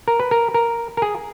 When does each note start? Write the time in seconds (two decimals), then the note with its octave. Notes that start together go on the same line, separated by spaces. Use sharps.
0.08 A#4
0.20 B4
0.31 A#4
0.54 A#4
0.97 A#4
1.02 G#4